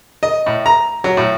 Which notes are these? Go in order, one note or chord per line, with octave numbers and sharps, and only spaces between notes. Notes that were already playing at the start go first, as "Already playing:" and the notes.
D#5
A2
A#5
F#3
A2